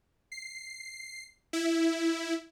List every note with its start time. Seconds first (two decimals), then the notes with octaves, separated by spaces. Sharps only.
0.32 C7
1.53 E4